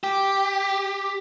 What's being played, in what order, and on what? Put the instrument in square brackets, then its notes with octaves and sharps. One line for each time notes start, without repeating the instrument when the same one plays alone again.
[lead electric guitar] G4